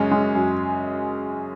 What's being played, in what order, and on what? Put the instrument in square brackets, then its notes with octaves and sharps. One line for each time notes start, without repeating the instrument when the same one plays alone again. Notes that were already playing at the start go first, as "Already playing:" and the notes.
Already playing: [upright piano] F#2 G#3 [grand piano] C#3 C#4
[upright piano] G#3
F#2